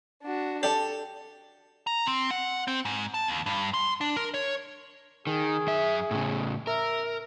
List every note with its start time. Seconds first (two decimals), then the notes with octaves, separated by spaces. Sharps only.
0.22 D4 F#4
0.63 G4 A4 D5 G5 A5
1.87 A#5
2.06 C4
2.31 F#5
2.68 C4
2.85 G#2
3.14 A5
3.28 D#2
3.46 G2
3.74 C6
4.01 D4
4.16 A#4
4.34 C#5
5.27 D#3 G#4
5.67 F#2 E5
6.11 A2 C#3
6.67 A#4 E5